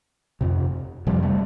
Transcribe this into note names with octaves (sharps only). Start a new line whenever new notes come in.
F2 C3
F2 C3 F3 G3
G3 A3